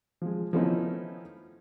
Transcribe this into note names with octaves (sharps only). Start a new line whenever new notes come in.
F3 G#3
F3 A3 B3 C#4 D#4 E4